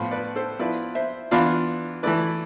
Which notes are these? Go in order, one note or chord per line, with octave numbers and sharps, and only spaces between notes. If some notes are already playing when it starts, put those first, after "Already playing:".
Already playing: A2 F3 B3 F4
B4 D5
A4 C5
F3 B3 E4 B4 D5
C5 E5
E3 B3 D4 F4 D5 F5
E3 A3 E4 B4 D5